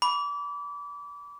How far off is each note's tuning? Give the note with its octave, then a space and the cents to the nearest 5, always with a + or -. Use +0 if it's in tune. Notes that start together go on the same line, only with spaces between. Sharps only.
B5 -10 D6 -30